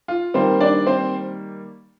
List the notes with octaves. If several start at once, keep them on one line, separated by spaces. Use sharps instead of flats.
F4
D#3 G3 A#3 C4 C5
D4 D5
C4 C5